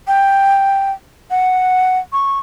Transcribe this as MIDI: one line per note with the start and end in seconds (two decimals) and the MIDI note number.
0.07 0.92 79
1.31 1.99 78
2.13 2.39 85